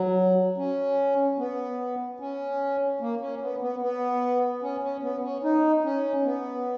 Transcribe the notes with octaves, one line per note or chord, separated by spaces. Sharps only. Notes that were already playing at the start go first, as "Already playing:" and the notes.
Already playing: F#3
C#4
B3
C#4
A#3
C#4
B3
B3
B3
C#4
C#4
B3
C#4
D#4
C#4
B3